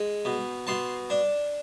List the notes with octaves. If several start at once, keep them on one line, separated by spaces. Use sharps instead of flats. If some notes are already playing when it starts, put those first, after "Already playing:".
Already playing: G#3
B2
B2 A5 C6
D4